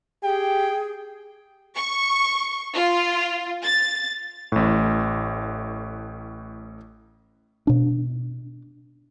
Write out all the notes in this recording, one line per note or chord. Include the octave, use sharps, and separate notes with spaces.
G4 G#4 G5
C#6
F4
A6
A1 A2
B2 D4